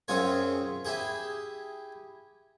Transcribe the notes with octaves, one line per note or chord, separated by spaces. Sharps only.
F#2 C4 F4 G#4 C#5
E4 G4 G#4